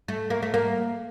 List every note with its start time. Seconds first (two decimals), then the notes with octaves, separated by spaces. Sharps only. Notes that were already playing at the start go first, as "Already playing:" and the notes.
0.08 A3
0.30 A#3
0.42 A3
0.54 A#3